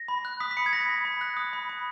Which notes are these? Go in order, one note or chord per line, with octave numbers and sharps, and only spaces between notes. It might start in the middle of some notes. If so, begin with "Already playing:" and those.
Already playing: A#6
B5
F#6
D#6 B6
B6
B5 C#7
G#6
B5 A#6
B5
B5
F#6
D#6
B5
B5